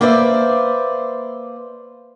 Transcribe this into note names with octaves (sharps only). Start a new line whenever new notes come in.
A#3 B4 C5 D5 E5